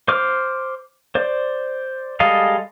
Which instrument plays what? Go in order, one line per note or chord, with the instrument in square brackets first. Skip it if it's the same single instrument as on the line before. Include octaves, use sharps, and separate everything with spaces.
[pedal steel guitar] C5 D6 F6
C5 D5
G3 G#3 A4 D#5 F5